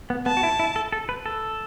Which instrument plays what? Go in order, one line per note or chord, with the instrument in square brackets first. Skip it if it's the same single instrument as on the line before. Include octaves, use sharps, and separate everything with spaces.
[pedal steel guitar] B3
[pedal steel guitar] B3 [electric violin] A5
[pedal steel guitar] F#4
E4
E4
A4
A4
B4
A4